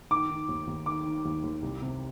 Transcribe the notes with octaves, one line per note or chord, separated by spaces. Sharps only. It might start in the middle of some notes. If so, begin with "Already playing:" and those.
D#3 D6
D#3
D#2
D#2
D#3 D6
D#3
D#2
D#2
C2
C3